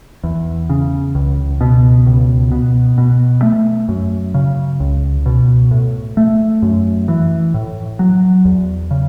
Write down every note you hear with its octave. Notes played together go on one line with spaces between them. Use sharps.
E2
C#3
C#2
B2
C#2
B2
B2
A3
F#2
C#3
C#2
B2
A2
A3
F#2
E3
A2
F#3
E2
C#3